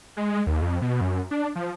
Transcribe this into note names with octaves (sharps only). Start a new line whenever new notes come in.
G#3
D#2
F2
B2
F#2
D4
F3